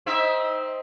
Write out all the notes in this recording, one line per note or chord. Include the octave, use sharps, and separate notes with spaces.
C4 D#4 E5